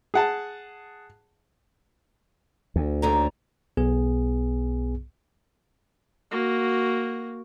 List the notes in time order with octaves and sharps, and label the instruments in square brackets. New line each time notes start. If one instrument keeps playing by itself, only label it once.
[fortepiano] G#4 F#5 A5
[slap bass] D2
[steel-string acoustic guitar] D#2 D3 A#5
[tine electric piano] B1 B3 G#4
[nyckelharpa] A#3 F#4